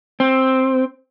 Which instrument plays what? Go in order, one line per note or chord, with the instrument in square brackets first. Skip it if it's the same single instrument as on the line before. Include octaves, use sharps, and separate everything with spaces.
[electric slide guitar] C4